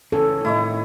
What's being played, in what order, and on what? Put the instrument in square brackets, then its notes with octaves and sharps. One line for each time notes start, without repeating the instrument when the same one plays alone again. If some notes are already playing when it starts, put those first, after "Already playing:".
[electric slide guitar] C#3 E3 C#4 [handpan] A4
[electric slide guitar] A2 D#3 [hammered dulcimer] E4 C#5 D#5